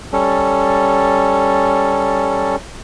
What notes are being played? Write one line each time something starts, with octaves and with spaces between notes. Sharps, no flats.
G3 C#4 A4